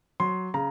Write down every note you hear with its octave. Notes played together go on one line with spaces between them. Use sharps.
F#3 C6
C#3 A#5